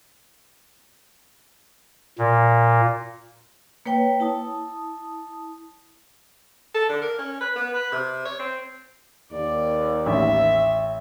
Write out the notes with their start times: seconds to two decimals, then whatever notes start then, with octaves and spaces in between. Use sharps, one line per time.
2.18 A#2
3.86 A#3 B4 C#5 G5
4.20 E4 A5 D#6
6.74 A4
6.89 D3
7.01 A#4
7.18 C#4
7.40 B4
7.56 B3
7.74 B4
7.92 C3
8.25 C#5
8.39 C4
9.31 D#2 D5
10.06 A1 E5